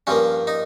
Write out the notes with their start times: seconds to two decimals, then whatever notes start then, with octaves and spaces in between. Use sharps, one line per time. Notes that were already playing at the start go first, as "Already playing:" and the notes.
0.07 G2 F3 A#3 C#4
0.47 D#4